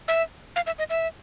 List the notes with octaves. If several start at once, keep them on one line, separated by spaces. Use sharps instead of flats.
E5
F5
E5
D#5
E5